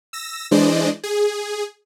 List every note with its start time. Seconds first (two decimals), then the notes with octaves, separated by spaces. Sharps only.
0.13 E6 A#6
0.51 E3 G#3 D4 C5 D5 D#5
1.04 G#4